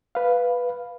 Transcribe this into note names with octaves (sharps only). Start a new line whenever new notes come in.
B4 F5